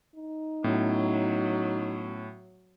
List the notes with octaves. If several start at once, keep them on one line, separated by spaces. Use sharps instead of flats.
D#4
A2 F#3 B3 C#4